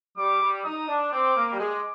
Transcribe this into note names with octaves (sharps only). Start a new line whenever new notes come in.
G3 D6
G3
D#4 D#6
D4
C4 D6
A#3
G3
G#3 D6